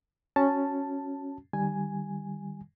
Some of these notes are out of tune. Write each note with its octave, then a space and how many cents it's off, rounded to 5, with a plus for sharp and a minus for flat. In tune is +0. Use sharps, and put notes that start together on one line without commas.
C#4 +0 F#4 +0 A5 +0
D#3 -30 G3 +0 G#5 +0